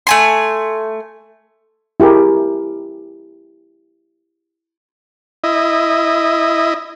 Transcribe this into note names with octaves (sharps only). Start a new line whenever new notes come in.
A3 G#5 C6
E4 G4 G#4 A#4
E4 D#5